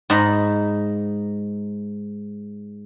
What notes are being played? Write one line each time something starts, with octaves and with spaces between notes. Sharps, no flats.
G#2 D#4 B5